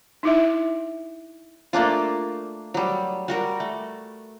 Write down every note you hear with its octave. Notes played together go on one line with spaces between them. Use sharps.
D#4 E4 E5
A3 A#3 D4 F4
F#3 G3
G3 F#4 A#4
A3